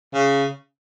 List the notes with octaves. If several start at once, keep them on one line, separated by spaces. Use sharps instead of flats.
C#3